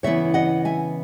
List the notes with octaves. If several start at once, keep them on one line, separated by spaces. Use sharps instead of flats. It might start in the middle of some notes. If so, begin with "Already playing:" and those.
C#3 E3 B3 C#5 E5
D#5 F#5
E5 G#5